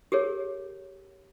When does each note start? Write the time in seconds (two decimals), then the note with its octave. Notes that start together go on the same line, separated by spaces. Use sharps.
0.12 G4 G#4 A#4 C#5